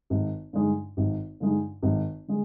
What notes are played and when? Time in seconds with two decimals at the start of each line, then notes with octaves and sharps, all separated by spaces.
0.10 G#1
0.53 G2 D3 G#3 D#4
0.97 G#1
1.40 G2 D3 G#3 D#4
1.83 G#1
2.28 D3 G#3